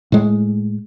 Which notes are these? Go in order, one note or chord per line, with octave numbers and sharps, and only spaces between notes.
A2 G#3